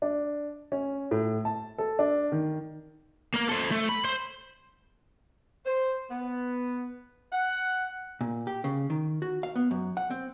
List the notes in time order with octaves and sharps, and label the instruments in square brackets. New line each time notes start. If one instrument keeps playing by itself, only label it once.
[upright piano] D4
C#4
A2
A5
A4
D4
D#3
[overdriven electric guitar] A#3 A#4
A4 C5
A3
B5
C5 C6
[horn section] C5
B3
F#5
[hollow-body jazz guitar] A#2
G4
C#3
D#3
F#4
F5
B3
F#2
F#5
C4